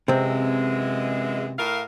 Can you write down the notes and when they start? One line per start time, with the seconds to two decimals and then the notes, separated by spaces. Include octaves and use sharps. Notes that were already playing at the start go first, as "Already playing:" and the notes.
0.08 F#2 C3 E3 G#3 C4
1.58 A2 A#4 F5